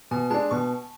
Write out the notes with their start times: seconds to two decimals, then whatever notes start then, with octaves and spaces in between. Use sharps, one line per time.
0.11 B2 G#5
0.30 G#3 D4 A5
0.51 B2 C#6